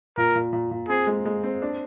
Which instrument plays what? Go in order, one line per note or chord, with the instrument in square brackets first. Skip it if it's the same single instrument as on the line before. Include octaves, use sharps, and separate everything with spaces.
[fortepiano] A#2 [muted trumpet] A#4
[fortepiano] A#2
A#2
A#2
[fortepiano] C4 [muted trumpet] G#4
[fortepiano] G#3
G#3
C4
D4